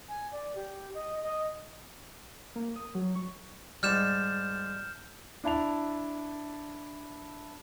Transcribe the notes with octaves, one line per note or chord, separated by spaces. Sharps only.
G#5
D5
G4
D#5
D#5
A#3
D#6
F#3
C#6
G#2 G3 F6 G6 E7
D4 E4 A5 F7